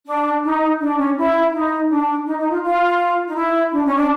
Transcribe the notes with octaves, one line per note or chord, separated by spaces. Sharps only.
D4
D#4
D4
C#4
E4
D#4
D4
D#4
D#4
F4
F4
D#4
E4
D4
C#4
D4